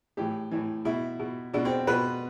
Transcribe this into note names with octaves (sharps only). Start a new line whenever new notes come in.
A2 E3 G4
A2 E3
B2 E4
B2
B2 D4
C4
B2 B4